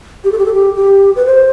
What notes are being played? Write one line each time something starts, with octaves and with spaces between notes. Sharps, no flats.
G4
A4
G4
A4
G4
G4
B4
C5